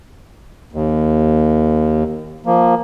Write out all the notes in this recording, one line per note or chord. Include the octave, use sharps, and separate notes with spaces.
D#2
F3 A#3